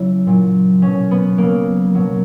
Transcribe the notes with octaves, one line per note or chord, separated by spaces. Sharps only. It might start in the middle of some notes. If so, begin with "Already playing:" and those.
Already playing: C#3 F#3 E4
A#2 F#3
B2 F#3 C#4
B3
C#3 F#3 A#3
B2 F#3